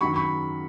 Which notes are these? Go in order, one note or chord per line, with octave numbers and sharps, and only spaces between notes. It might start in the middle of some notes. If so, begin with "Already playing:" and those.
F#2 D#3 F#3 B5 C#6
B5 C#6